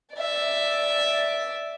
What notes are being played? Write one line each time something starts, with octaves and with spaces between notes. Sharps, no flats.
D5 E5